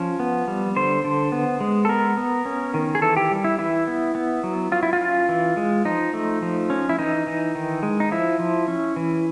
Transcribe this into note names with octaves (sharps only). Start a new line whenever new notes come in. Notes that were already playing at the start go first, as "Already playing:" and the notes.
Already playing: F3 C#4
B3
G3
D3 C5
D3
B3
G#3
A4
B3 A#4
B3
C#4
D#3
G#4
E3 A4
G4
G3
E4
E3 E4
B3
B3
F#3
F#3 F4
E4
F4
C#4
E3
G#3
F3 D#4
A3
F3
C#4
E4
E3 D#4
E3
D#3
G#3
D#4
F3 E4
F3
C#4
E3